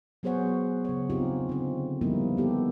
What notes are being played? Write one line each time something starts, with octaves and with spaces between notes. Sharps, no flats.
F#3 B3 G#4 C5 C#5 F#5
C#3 C#5
C4 C#4 D#4 F4 G4
D3 C4
F3 G3 A#3 B3 D#4 E4
B3 G4 A4